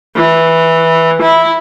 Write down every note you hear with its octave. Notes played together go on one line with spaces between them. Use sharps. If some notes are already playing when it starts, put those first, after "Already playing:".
E3
E4